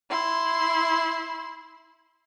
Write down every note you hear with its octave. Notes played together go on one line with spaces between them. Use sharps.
E4 C6